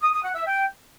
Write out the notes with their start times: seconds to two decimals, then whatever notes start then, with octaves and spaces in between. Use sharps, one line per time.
0.02 D#6
0.13 D#6
0.24 F#5
0.35 E5
0.46 G5